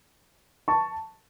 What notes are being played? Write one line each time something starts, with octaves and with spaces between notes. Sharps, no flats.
A5 C#6